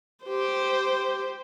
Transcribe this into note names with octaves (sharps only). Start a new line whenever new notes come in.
G4 C5